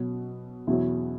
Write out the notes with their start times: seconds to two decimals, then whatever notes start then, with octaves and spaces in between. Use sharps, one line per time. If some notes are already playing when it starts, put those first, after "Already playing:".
Already playing: B2 F#3
0.67 E2 B2 F#3 E4